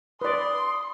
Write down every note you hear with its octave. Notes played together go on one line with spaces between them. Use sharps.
B4 D5 C6 D#6